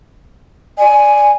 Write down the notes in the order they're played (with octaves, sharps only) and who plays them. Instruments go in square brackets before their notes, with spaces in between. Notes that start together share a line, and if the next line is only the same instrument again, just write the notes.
[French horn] D5 [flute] G#5